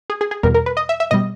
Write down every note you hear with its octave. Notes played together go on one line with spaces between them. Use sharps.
G#4
G#4
G#4
E2 B2 G3 A#4
A#4
B4
D#5
E5
E5
B2 G3 D#5